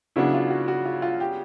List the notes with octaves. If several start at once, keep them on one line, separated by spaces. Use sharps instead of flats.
C#3 F#3 B3 D4 E4
F4
F#4
F#4
F4
F4
G4